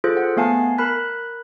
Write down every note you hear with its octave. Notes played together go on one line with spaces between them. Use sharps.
F4 G#4 A4 C5
F#5
A3 B3 F5 G#5 A5 C7
A#4 B5 F#6 B6